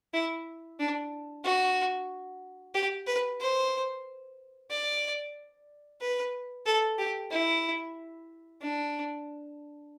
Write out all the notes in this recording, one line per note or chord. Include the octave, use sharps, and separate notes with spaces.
E4
D4
F#4
G4
B4
C5
D5
B4
A4
G4
E4
D4